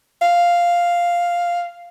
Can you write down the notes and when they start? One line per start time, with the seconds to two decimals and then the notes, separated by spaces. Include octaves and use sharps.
0.21 F5